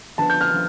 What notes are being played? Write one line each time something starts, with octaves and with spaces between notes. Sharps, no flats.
D3 F3 B3 A5
G6
F6
D3 F3